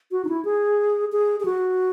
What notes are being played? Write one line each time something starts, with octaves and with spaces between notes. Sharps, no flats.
F#4
D#4
E4
G#4
G#4
G#4
F#4